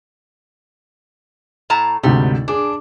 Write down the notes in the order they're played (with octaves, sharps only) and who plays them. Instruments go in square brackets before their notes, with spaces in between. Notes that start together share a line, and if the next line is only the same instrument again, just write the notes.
[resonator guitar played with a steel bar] A2 A5 A#5
[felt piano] D2 G#2 C3 [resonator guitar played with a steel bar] G3
[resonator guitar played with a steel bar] D4 [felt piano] G#4 D6